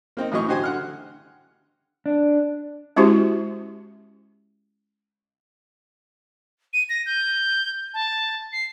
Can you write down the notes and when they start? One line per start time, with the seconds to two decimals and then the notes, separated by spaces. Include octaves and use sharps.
0.17 A#3 C4 D#4
0.32 A2 E3 F#3 E4 D#5 C#6
0.48 D3 F#4 G4 C5 G#5 C6
0.63 D3 F#5 F6
2.06 D4
2.96 G#3 C#4 E4 F#4 G4 C5
6.73 D#7
6.89 A#6
7.06 G6
7.94 A5
8.53 C7